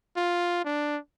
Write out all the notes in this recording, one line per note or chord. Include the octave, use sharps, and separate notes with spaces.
F4
D4